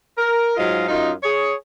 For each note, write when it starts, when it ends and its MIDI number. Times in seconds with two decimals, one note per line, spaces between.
0.17 0.56 70
0.57 0.87 44
0.57 0.87 54
0.57 0.87 56
0.57 0.87 65
0.57 0.87 75
0.57 0.87 77
0.88 1.12 42
0.88 1.12 63
0.88 1.12 65
1.23 1.54 68
1.23 1.54 73